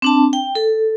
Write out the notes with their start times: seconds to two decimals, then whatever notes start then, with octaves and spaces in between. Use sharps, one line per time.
0.02 C4 D4 A5
0.33 G5
0.55 A4